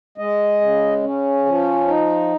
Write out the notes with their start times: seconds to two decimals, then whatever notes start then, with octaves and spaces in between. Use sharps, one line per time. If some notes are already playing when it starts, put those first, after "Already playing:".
0.18 G#3 D#5
0.61 C#3
1.03 C#4
1.46 F3
1.88 D#4